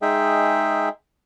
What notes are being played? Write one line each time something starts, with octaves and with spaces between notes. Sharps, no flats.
G#3 D#4 G#4 E5 G5